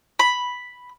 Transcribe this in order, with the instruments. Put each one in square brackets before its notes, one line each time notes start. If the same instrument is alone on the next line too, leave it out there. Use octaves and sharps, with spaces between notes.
[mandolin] B5